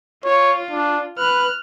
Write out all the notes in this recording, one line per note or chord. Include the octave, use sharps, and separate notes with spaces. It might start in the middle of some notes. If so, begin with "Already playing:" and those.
F4 C#5
D4
B4 F6 F#6